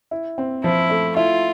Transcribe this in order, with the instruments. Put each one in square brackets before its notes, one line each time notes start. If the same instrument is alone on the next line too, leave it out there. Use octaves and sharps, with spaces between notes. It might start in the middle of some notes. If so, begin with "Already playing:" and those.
[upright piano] E4
C4
[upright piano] F3 [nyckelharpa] E4
[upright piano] A3
[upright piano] E4 [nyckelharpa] F4